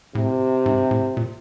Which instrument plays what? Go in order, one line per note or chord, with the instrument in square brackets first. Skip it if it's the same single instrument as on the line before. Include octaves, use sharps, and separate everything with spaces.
[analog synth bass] A2 [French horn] C3
[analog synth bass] G#2
A2
A#2